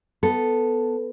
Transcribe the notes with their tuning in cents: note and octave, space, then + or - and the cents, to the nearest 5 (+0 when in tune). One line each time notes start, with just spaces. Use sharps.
B3 +5 A4 +0